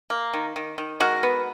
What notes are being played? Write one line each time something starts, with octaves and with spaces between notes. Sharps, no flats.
A#3
D#3
D#3
D#3
G#3 F#4 A#4
B3